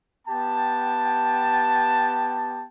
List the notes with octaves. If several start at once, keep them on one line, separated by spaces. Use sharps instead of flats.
B3 G4 G5 A5